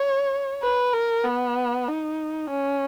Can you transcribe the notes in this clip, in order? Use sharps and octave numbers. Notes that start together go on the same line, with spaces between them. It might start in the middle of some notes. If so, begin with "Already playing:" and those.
Already playing: C#5
B4
A#4
B3
D#4
C#4